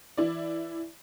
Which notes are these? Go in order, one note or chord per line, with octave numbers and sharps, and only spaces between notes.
E3 E4 D5